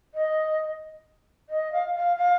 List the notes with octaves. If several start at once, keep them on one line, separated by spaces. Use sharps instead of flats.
D#5
D#5
F5
F5
F5